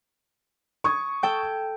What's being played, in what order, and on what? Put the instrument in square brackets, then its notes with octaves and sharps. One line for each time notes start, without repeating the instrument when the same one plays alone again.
[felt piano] C#6 D#6 G#6
[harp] A4 G5 G6